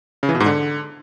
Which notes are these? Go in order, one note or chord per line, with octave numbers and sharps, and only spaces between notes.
C#3
E3
B2
G#2
D3